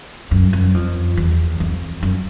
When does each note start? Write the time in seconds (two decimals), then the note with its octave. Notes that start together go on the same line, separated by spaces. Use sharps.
0.31 F#2
0.53 F#2
0.74 F2
1.17 E2
1.60 F2
2.03 F#2